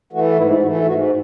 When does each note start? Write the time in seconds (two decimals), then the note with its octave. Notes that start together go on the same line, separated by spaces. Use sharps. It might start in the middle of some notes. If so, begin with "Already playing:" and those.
0.13 E3 A3 F#4
0.37 G#2 E4
0.50 E4
0.62 E3 A3 F#4
0.74 E4
0.86 G#2 F#4